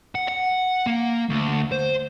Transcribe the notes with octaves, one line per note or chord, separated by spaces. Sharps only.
F#5
F#5
A#3
D2
C5